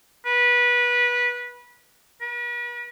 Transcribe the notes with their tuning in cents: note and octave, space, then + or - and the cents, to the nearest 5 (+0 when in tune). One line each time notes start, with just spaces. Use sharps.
B4 -20
B4 -40